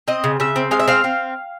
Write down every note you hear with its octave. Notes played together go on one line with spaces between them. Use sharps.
C4 D#5
C#3
C#3 E5
C4
G#3 F5
E5
C4 F5
C4